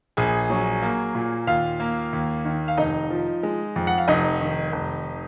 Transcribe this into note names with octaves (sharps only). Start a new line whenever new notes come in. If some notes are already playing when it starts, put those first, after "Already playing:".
A#1 G#4 G#5
F#3
A#3
A#2
D#2 F4 F5
A#3
D#2
D#3
F5
F1 D#4 D#5
F3
G#3
F2
F#5
F5
F1 D#4 D#5
D#3
F1